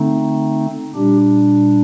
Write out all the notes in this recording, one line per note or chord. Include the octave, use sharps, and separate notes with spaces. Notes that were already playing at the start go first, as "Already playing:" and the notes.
Already playing: D3 A3 C4 D#4
A#2 G3 D4 G4